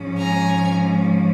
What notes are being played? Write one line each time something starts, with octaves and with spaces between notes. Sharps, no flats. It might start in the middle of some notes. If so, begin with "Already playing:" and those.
Already playing: G#2 F3 G#3 C#4
G#5 A#5